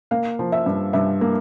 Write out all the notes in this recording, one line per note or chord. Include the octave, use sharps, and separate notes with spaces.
A#3 F5
F3
E5
G2
G2 E5
A#3